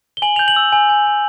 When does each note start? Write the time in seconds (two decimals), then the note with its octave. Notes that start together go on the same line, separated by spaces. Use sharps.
0.17 G7
0.22 G#5 F#7
0.36 G6 F7
0.48 F#7
0.56 E6
0.72 G#5
0.89 G#5
1.07 G#5